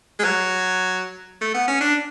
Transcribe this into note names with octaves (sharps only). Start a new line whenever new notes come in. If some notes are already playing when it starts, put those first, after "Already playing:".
G#3
F#3
A3
B3
C#4
D4